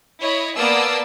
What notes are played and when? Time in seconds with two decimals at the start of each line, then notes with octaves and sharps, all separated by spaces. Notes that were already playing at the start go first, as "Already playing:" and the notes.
0.20 E4 C#5 D#5 B5
0.56 A#3 B3 D5 A5 D#6 E6